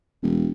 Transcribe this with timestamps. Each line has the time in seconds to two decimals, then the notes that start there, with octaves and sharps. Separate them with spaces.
0.22 E1